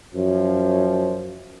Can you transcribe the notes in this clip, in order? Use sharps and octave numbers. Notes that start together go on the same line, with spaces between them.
F#2 F3